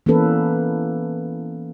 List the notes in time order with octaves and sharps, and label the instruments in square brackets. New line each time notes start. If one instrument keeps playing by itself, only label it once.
[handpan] E3 A#3 B3 C#4 A4 B4